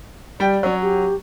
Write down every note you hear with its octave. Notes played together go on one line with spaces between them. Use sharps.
G3 D5 G5
F#3 C#4
G4